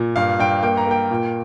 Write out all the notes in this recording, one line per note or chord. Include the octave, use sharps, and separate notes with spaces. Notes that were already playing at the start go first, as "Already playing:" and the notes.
Already playing: A#2
G2 F5
G2 G5
A#3 G5
A#5
A#3 G5
A#2